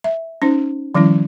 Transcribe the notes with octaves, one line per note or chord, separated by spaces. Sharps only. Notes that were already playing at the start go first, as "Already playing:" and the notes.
E5
C#4 D#4 C5
D#3 F3 G3 C#4 E4